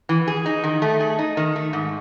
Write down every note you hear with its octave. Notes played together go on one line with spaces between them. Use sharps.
E3
G#4
D#4
D#3
A3
G#4
D#4
D#3
A3
G#2